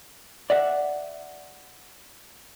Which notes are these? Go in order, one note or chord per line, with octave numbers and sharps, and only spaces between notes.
D5 E5 F#5